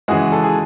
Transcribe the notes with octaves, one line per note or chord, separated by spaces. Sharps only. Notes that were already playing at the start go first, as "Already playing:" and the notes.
C#3 E3 G#3 F#4 G#4
A4
G#4